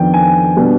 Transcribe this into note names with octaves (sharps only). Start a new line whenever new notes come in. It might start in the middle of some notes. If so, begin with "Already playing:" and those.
Already playing: F2 D#3 B3 D4 G5
G#5
B2 G3 B3 D4